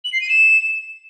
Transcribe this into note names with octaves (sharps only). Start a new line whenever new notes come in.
F#7
C7
D#7
E7